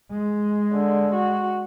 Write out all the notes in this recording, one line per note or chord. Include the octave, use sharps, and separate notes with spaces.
G#3
D3
F#4